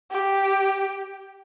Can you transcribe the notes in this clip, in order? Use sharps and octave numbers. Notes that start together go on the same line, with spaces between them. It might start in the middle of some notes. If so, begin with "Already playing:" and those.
G4